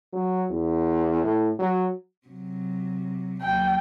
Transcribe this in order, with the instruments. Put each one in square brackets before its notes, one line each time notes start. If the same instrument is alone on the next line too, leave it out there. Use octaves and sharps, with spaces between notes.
[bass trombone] F#3
E2
A2
F#3
[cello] C3 F#3
[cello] D#2 F#3 [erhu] G5